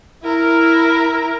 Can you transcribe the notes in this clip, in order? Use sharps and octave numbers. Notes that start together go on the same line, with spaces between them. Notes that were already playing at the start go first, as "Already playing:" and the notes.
E4 A#4